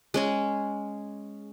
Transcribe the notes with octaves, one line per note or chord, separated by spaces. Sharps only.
G#3 C#4 G#4